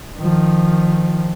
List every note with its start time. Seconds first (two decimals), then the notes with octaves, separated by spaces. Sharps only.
0.18 D#3 F3